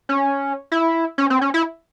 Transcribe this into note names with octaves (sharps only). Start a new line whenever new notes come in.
C#4
E4
C#4
C4
C#4
E4